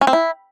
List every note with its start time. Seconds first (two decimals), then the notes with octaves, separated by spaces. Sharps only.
0.01 C#4
0.07 C4
0.13 E4